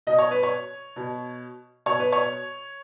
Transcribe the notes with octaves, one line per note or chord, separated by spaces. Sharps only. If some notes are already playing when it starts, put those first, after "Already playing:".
B2 D#5
C#5
B4
C#5
B2
B2 C#5
B4
C#5